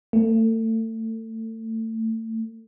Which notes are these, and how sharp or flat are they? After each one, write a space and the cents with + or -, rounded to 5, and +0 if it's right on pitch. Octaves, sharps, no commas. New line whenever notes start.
A3 +30